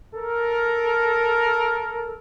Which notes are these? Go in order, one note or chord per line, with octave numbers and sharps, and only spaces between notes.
A4 A#4